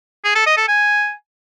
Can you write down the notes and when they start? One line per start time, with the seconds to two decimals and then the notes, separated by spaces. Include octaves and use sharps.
0.24 G#4
0.35 A4
0.46 D#5
0.57 A4
0.68 G#5